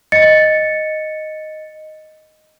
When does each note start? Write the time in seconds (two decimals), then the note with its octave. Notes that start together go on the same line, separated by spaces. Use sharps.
0.12 D#5 A6 C#7